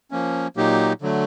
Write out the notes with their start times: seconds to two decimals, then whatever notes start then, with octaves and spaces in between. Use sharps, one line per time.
0.11 F3 A#3 C#4
0.57 A#2 F#3 A#3 D#4 G4
1.02 D3 F#3 A3